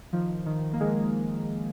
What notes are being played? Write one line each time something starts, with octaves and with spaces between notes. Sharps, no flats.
D#3 F3
D#3
A#3
D#3 G#3